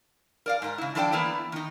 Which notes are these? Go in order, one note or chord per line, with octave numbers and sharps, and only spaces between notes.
A#4 D5 F5
G#2 A#4
C#3 E4
F3 D4 E4 A4 D5 G5
E3 A#3 B3 E4 D5
D#3 D#4